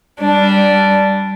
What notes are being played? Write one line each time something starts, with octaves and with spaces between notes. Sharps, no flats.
G3 D4